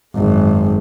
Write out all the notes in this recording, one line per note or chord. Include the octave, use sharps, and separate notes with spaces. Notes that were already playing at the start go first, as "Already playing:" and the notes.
G#1 F#2